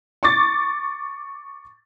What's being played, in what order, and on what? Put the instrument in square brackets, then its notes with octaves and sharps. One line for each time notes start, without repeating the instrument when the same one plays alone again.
[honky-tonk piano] C#6 D6 A6